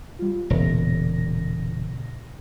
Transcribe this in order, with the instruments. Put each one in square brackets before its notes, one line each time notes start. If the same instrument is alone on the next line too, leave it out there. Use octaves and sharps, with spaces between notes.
[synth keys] G3 F4
[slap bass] E1 [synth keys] A#2 C#3 A#6